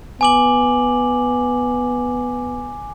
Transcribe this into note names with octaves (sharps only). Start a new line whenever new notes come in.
B3 G#5 D6 F#7